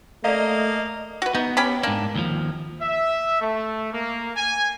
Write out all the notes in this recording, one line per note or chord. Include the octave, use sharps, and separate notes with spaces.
A3 A#3 D5 D#5 F5
F#4 B4
B3 D#4
C#4 G4 B5
G#2 A#3 D4
D#2 F3
E5
A3
A#3
G#5